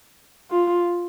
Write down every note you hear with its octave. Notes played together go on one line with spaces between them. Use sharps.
F4